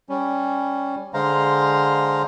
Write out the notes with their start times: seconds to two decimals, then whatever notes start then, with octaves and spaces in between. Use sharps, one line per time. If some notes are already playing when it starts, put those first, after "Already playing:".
0.09 G3 C#4
1.14 D3 G#3 C5 F5 A#5